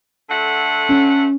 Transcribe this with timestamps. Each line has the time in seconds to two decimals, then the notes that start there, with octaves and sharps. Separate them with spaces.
0.29 D3 A3 F#5
0.89 C#4